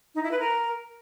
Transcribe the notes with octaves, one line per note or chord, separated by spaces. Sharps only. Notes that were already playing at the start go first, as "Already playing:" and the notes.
D#4
E4
B4
A#4